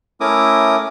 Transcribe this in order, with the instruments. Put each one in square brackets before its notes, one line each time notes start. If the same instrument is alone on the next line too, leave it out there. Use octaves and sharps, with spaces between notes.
[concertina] A3 C#4 E4 A#4 D6 D#6